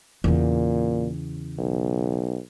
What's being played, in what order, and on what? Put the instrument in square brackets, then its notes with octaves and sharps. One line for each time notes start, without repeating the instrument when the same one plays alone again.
[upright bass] E2 C#3 [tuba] A#2
[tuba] B1